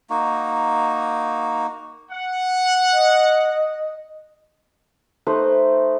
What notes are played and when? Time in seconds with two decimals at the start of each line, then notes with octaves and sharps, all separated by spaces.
0.10 A#3 D#4 F#4
2.11 F#5
2.93 D#5
5.27 A3 D#4 B4 C5